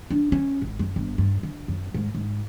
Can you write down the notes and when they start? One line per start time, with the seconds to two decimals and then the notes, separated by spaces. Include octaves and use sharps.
0.10 D4
0.32 C#4
0.62 G#1
0.79 F#2
0.96 G1
1.18 G2
1.43 D3
1.68 F#2
1.94 G#2
2.15 G#2